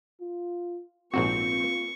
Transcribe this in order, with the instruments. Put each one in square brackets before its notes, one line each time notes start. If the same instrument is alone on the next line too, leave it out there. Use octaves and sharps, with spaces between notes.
[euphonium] F4
[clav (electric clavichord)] A#1 G#2 F#4 [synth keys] C4 [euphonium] F4 [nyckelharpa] C#6